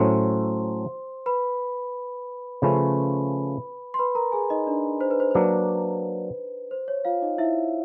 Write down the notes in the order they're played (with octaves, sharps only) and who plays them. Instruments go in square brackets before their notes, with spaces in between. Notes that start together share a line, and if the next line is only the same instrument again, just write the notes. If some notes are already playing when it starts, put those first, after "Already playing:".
Already playing: [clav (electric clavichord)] A2 F#3 A3 C#4 [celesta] C5 C6
[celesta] B4 B5
[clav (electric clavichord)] C#3 F3 A3 C#4 [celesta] B4 B5
[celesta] C6
B4 B5
A#4 A#5
G#4 G#5
D#4 D#5
D4 D5
C5
B4
C5
C5
[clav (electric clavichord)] F#3 A#3 D4 [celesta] B4
[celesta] C5
C#5
F4 F5
D#4 D#5
E4 E5